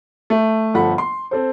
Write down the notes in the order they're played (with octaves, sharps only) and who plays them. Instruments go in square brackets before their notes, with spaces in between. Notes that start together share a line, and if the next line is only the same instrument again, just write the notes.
[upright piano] A3
G1 F3 A4 F#5 B5
C6
C4 A4 C5